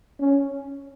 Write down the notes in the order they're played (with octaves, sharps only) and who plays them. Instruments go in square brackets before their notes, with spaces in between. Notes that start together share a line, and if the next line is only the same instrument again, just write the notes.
[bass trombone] C#4